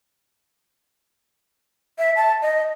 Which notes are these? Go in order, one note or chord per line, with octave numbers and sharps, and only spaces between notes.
E5
A5
D#5